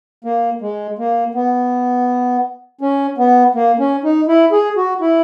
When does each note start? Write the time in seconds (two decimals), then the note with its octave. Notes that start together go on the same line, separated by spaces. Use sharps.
0.24 A#3
0.61 G#3
0.98 A#3
1.34 B3
2.81 C#4
3.18 B3
3.55 A#3
3.79 C#4
4.04 D#4
4.28 E4
4.52 G#4
4.77 F#4
5.01 E4